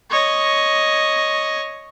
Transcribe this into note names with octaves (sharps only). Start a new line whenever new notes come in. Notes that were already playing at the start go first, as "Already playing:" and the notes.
C#5 D#5